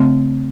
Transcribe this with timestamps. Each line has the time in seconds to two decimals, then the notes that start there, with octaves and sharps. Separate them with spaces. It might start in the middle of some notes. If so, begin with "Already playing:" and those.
Already playing: C#3 A3 C4